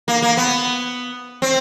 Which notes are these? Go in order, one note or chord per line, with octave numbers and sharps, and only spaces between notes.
A#3
A#3
B3
C4